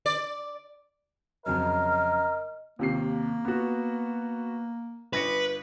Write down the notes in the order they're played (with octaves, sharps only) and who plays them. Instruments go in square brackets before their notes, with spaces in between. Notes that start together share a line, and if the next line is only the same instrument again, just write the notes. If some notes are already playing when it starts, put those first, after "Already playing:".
[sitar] D5
[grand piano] F2 C#3 F#3 [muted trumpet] A#4 [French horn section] D#5 [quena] F6
[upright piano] D#2 C3 C7 [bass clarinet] A#3
[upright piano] B3 F#4
[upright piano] G1 A#6 C#7 [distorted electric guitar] B4